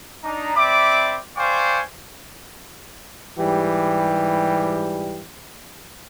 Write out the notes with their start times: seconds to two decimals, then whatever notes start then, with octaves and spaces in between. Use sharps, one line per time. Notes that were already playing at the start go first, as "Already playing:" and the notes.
0.23 D4 D#4 A#5
0.56 C4 D5 E5 B5 D6
1.37 C5 D5 F5 G5 G#5 C#6
3.38 G#2 E3 G3 G4